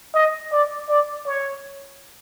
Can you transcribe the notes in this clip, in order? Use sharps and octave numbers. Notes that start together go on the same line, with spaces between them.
D#5
D5
D5
C#5